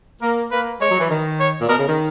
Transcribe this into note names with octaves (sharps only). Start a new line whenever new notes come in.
A#3 A#4
A#3 B4
G#3 C#5
F#3
E3
D#3
C#5
A#2
B2 A#4
C#3
D#3